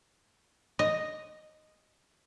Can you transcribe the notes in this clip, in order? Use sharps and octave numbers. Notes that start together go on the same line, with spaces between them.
D#5